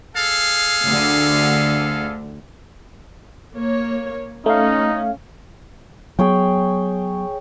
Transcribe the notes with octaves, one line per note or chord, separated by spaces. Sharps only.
G#4 A4 F5
D2 D3
A#3 C#5
A3 C#4 D#4 F5
F#3 B3 G#4 C#5 G5